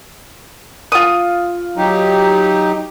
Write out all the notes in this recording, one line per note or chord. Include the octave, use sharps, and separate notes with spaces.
F4 D#6
F#3 D#4 G4